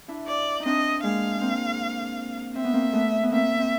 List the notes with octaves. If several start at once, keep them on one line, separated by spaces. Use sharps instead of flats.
D4 E4
D5
D#4
C4 D4 D#5
G#3 A#3 F5
A#3 C4
C4 E5
B3
A#3 C4
A3 B3
B3
A#3 C4 E5
C4